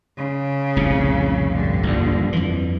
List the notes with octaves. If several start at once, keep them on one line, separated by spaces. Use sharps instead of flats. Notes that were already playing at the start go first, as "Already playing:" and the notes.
C#3
F1 C2 A#2
G2 D3
A#1 D#2
F2 E3